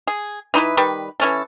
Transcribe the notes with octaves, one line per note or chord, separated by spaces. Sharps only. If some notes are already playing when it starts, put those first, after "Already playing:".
G#4
E3 D#4 E4 B4
D#3 G3 B4
E3 C#4 A4